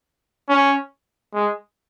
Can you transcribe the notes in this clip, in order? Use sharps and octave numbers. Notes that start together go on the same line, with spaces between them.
C#4
G#3